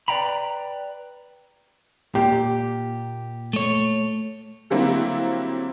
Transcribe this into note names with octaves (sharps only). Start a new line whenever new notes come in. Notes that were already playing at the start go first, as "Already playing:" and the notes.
B4 D5 F5 G5 A#5 B5
A#2 G4
A3 C#5
D3 F#3 G3 A#3 C4 E4